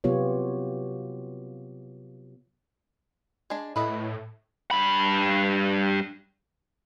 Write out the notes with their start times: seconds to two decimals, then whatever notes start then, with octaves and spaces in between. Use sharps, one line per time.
0.04 C3 F#3 B3 F4 G4 C#5
3.50 G#3 D4
3.76 A2 E4 B4 D#5
4.71 G2 B5